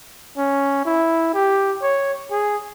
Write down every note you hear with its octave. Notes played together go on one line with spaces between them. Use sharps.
C#4
E4
G4
C#5
G#4